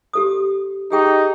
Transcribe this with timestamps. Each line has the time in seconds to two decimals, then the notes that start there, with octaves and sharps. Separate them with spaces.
0.13 G4 A4 D#6
0.92 D#4 G4 G#4 G5